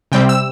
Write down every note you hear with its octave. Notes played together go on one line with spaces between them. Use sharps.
C3 G3 C4 G5
E6